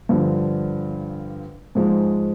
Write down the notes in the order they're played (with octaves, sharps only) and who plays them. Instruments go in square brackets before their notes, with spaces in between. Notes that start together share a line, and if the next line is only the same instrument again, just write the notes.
[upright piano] G2 D3 F3
G#2 F3 G#3